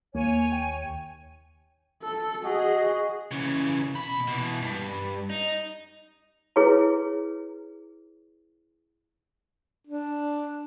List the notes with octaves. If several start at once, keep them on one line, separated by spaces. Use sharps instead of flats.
D#2 A#3 C#5 G#5
G5
A4
F#4 G#4 D#5
C#3 E3
B2 B5
B2 E3
G2
D#4
E4 G#4 B4 C#5 A#5
D4